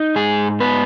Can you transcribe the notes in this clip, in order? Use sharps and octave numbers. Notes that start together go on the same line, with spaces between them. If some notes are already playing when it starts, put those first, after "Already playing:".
Already playing: D#4
G#2 G#4
B3 B4